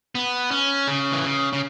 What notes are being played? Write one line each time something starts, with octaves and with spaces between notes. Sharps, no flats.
B3
C#4
C#3
E3
C#3
C#3